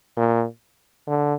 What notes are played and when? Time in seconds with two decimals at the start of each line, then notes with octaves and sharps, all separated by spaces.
0.17 A#2
1.07 D3